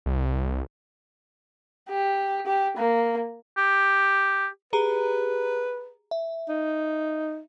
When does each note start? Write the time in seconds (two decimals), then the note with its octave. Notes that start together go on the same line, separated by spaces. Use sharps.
0.06 C2
1.89 G4
2.46 G4
2.76 A#3
3.57 G4
4.73 G4 G#4 B4 A#5
6.11 E5
6.49 D#4